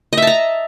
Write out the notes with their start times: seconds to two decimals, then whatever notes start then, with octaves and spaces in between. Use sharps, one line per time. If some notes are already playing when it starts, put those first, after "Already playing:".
0.13 D#5
0.17 E5
0.22 A5
0.27 A#5